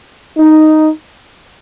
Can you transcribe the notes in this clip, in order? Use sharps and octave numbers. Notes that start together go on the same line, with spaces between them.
D#4